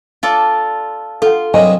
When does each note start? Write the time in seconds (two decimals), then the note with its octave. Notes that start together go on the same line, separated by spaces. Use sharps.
0.23 F4 A4 D5
1.22 F4 A4 F#5
1.54 C2 G2 F#3 D#5 G#5 C6